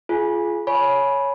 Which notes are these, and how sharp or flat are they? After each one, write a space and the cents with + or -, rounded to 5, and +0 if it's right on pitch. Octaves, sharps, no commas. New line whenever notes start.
F4 -15 G#4 +25 G#5 +0
C#5 +0 G#5 +20 B5 -15